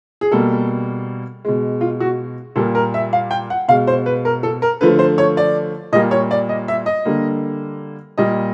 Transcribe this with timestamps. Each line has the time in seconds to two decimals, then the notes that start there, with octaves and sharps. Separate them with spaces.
0.21 G#4
0.32 B2 G3 A#3 A4
1.45 B2 G#3
1.81 F4
2.00 F#4
2.56 A#2 G3 A#3 A4
2.75 A#4
2.94 E5
3.13 F5
3.31 G5
3.50 F#5
3.68 B2 G#3 F5
3.87 C5
4.06 B4
4.25 A#4
4.43 A4
4.62 A#4
4.81 D3 F3 A3 B4
4.99 C5
5.18 C#5
5.37 D5
5.92 A#2 G3 A#3 D#5
6.11 C#5
6.31 D5
6.49 D#5
6.68 E5
6.86 D#5
7.05 D3 G3 A#3
8.18 A#2 G3 A#3 D#5